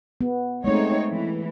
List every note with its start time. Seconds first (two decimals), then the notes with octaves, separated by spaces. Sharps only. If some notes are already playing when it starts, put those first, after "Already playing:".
0.21 B3
0.64 G#3 A3 C4 D#4 C#5
1.10 E3